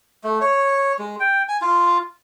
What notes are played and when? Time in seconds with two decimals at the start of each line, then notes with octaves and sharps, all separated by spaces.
0.24 A3
0.41 C#5
0.99 G#3
1.20 G5
1.48 G#5
1.62 F4